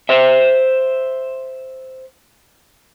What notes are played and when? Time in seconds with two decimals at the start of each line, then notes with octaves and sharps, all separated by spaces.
0.09 C5 E5